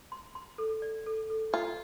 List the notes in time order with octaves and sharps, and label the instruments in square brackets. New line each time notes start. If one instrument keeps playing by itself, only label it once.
[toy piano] C6
C6
A4
D5
A4
A4
[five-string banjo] F4 [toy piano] D5